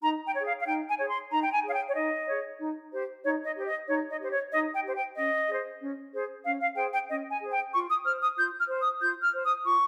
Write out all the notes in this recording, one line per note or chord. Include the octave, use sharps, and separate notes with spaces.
D#4 A#5
G5
G#4 C#5
F5
F5
D#4 G5
G#5
G#4 C#5
C6
D#4 A#5
G5
G#5
G#4 C#5 F5
G5
C#5
D#4 D#5
G#4 C#5
D#4
G4 C5
D#4 C#5
D#5
G4 C5
D#5
D#4 C#5
D#5
G4 C5
C#5
D#4 D#5
G5
G4 C5
G5
C#4 D#5
G#4 C5
C#4
G#4 C5
C#4 F5
F5
G#4 C5 G5
G5
C#4 D#5
G#5
G#4 C5
G5
F4 C#6
D#6
C5 F6
D#6
F4 G6
F6
C5
D#6
F4 G6
F6
C5
D#6
F4 C#6